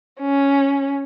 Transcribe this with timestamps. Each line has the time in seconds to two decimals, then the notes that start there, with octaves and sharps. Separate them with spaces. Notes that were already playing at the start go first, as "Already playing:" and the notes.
0.20 C#4